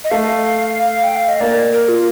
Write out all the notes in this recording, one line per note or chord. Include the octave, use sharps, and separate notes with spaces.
D#5
A3 F5
G5
F5
D#5
A#3 D5
A#4
F4